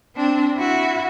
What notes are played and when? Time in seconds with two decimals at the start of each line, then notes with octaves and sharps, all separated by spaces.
0.15 C4 D4
0.57 E4 F#4